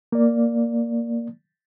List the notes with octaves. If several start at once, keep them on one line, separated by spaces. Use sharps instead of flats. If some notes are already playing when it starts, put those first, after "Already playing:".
A#3 D5